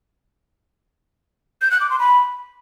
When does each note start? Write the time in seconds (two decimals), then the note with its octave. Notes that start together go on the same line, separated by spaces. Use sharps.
1.62 G6
1.71 F#6
1.80 D6
1.90 C6
1.99 B5